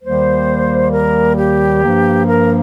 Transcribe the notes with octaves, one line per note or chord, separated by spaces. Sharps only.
D#2 D#3 G3 A#3 C5
A#4
G4
G2 F3 A#3
A#4